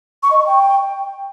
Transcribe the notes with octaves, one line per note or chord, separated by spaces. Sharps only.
C#6
D#5
C#6
G5